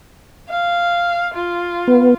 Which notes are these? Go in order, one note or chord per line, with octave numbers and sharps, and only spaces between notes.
F5
F4
B3